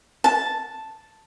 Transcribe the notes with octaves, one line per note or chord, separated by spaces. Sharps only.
A5